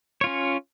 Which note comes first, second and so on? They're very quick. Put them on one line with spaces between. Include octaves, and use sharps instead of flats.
C#5 F4 C#4